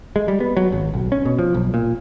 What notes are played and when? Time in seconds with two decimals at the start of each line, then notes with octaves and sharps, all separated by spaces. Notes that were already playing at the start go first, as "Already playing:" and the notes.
0.16 G#3
0.28 G3
0.40 B3
0.57 F#3
0.72 G#1
0.94 B1
1.12 C#4
1.25 B2
1.39 F3
1.54 B1
1.74 A#2